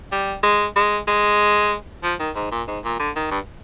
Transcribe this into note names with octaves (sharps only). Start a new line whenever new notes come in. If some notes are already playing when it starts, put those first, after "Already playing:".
G3
G#3
G#3
G#3
F3
D#3
G#2
A#2
G#2
A#2
D3
D#3
G2